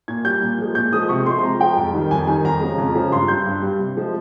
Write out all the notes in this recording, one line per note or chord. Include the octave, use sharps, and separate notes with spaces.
A#2 G#6
G3 G6
A#2
F3 G#3
A#2 G6
F3 G#3 D#6
C3 C#6
F3 G#3 C6
C6
C3 A#5
F3 G#3 G5
F2
D#3 G3
F2 G#5
D#3 G3 G#5
F2 A#5
C#3 F3 G#3
F2
C#3 F3 G#3
G2 C6
G3 G6
G2
G3
C3
F3 G#3